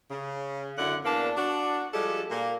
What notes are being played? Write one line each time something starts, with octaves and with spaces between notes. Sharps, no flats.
C#3
F#2 D3 E4 F#5
E2 A#3 D4
D4 F#4
F3 G3 G#3 A4
A#2 A#3